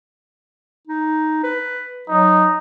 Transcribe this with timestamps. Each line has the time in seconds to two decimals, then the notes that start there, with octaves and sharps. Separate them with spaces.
0.87 D#4
1.43 B4
2.09 F#3 D#4